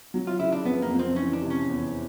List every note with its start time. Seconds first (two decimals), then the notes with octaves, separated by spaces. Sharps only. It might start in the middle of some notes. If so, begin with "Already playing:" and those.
0.14 F#3
0.27 F4
0.40 C#3 E4
0.52 D4
0.65 F2 B3
0.82 A#3
0.91 F2
0.99 C4
1.16 E3 C#4
1.33 D4
1.42 C3
1.50 C#4
1.67 E2